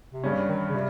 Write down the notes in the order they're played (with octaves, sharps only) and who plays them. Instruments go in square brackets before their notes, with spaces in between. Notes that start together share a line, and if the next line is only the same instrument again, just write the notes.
[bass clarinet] C3
[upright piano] G2 G3 C#4 [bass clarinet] C#3
[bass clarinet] D#3
C#3
[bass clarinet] C3 [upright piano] G3